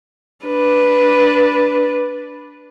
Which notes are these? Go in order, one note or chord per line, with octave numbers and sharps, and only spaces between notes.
D4 B4